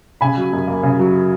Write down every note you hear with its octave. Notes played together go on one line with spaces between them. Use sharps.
C#3 G#5 B5
F#3
F#2
A#3
C#3
F#3